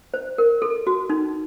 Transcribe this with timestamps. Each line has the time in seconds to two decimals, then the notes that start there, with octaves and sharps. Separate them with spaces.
0.14 C5
0.38 A#4
0.62 A4
0.87 F#4
1.10 D#4